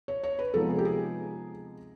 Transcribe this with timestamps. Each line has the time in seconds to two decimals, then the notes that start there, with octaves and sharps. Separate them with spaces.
0.08 C#5
0.23 C#5
0.39 B4
0.54 C3 F3 G#3 B3 D#4 A4
0.69 G#4
0.78 G4
0.85 G#4